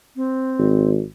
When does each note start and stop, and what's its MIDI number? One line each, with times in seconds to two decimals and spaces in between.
0.16 0.90 60
0.58 1.01 32